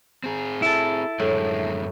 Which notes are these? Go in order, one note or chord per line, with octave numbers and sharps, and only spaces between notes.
C4 G#4
E4 A4
F#2 A2 D3 G#3